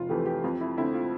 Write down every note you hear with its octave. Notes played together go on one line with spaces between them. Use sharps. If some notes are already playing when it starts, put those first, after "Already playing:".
Already playing: F1 F4
F2 E3 A3 G4
G4
F2 F4
E4
D3 A3 C4 E4
F4